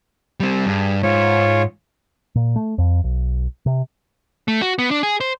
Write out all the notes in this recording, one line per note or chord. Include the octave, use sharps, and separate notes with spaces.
G3 C4
G2 G#4
G#2 F4 C#5
A#2
A3
F2
B1
C3
A3
F#4
B3
D4
G#4
C5